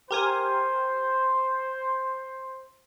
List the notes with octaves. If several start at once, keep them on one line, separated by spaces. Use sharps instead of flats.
G4 A#4 C5 G#5